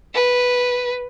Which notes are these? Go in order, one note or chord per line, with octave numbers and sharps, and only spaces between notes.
B4